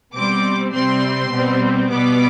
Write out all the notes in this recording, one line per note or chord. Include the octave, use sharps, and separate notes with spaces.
B2 G3 C4 D6
C3 G3 C4 C6
B2 G3 C4
B2 G3 B3 D6